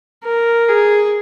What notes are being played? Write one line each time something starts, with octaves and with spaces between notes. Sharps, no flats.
A#4
G#4